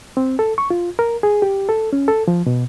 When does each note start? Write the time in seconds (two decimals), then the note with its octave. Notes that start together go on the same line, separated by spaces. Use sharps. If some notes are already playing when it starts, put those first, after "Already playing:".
0.17 C4
0.39 A4
0.58 C#6
0.70 F4
0.99 A#4
1.23 G#4
1.42 G4
1.69 A4
1.93 C#4
2.08 A4
2.28 F3
2.46 B2